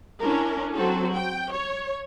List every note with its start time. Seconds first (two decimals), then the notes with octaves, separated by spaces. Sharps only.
0.20 C#4 D4 E4 A#4
0.75 F#3 C4 F#4 A4
1.14 G5
1.52 C#5